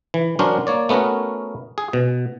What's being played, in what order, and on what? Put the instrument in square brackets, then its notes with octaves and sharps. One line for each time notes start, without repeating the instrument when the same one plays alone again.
[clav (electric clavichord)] E3
F#3 C#4 D4 A#4 C5
A#3 C#5 D5
A3 B3 C#4 F#4 A#4
G#4
B2